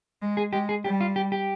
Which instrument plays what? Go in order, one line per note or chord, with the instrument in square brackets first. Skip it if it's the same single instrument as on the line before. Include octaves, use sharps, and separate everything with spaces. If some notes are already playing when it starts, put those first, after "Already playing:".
[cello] G#3
[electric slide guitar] G#4
[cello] G#3 [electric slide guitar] G4
[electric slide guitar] G#4
[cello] G3 [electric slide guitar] G4
[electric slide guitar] F4
G4
G4